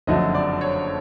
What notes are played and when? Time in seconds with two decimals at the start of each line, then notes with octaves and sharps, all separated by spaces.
0.07 F#1 F2 D3 F#3 A3 D#5
0.35 D5
0.61 C#5